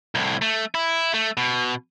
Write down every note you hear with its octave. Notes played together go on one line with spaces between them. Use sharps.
C2 A2
A3
E4
A3
B2